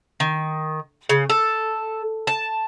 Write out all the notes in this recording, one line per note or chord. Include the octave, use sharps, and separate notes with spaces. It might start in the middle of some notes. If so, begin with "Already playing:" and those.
D#3
C#3
A4
A5